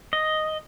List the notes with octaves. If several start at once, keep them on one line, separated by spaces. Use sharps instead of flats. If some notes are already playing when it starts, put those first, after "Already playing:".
D#5